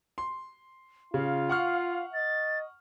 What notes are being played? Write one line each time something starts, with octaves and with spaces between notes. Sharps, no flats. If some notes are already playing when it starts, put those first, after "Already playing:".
C6
C#3 F4 F5
F#5 C#6 F6
D#5 A6